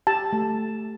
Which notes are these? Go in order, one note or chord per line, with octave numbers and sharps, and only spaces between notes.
G4 A5
A3